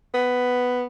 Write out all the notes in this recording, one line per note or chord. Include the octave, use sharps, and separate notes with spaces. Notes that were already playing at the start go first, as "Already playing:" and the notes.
B3